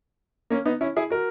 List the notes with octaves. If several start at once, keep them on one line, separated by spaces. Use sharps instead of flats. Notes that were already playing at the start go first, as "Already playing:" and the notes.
A#3 C#4
B3 D#4
C#4 E4
E4 G#4
F#4 A#4